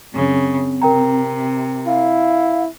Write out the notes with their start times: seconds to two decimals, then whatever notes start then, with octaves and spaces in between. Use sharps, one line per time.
0.13 F#2 C#3 C4
0.82 C3 A#4 G5 A#5
1.86 E4 F5